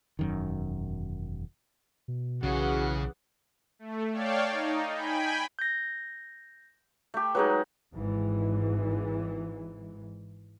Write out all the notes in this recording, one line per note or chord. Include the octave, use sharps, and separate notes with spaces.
E1 F#2 D#3
B2
B1 C#3 E3 F#4 G#4 F#5
A3
C#5 D5 F5 G5 A5
D#4
G5 G#5 B5
G6 A#6
A3 G4
F#3 G#3 D#4 G#4 B4
G#1 G#2 E3